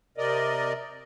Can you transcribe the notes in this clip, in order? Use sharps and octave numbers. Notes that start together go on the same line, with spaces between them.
C3 A#4 D5 D#5